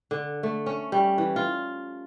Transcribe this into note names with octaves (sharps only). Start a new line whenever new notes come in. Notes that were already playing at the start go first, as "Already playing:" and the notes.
D3
A3
C#4
G3
E3
F4